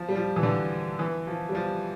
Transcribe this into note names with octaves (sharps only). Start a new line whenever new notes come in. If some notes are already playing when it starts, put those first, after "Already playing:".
Already playing: F3
G3
F3
E3
D3
E3
F3
G3
F3